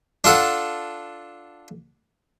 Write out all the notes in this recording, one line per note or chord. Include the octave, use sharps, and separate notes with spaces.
D4 F4 A4 F#5